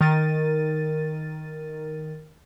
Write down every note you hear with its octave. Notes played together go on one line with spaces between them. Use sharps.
D#3 A#4 A6 D#7